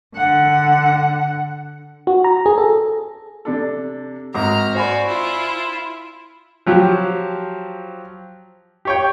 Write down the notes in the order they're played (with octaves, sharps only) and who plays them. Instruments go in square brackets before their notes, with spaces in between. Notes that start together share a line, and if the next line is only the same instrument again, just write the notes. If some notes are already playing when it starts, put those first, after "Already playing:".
[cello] D3 F#5
[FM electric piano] F#4
A#5
G#4
A4
[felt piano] C3 D4 A4
[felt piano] G#1 [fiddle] A#5 F6
[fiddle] F#4 D5 [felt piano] C5 G#5 B5
[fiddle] E4 F4
[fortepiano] F3 F#3 G4
G4 C#5 G5